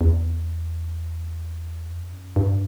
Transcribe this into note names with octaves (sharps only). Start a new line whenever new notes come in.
E2
F2
F#2
G2